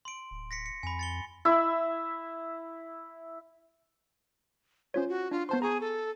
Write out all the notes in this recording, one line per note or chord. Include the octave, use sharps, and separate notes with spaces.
C6 D7
D1
A#6 B6 C#7
C#7
F2 G#5 B5
A6 C#7 G7
E4 E6
C#4 F4 C5 C#5
F#4
D4 F4
B3 C5 A5 C6
G#4 A#5 C#6
A4